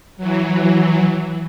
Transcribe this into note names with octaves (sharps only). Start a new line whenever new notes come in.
E3 F#3